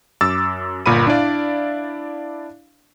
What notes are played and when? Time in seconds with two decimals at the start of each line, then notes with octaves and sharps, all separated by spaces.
0.21 F#2 D6 E6 A6
0.86 G1 A#2 A#4 B5 D#7
1.07 D4 E4 D5 F5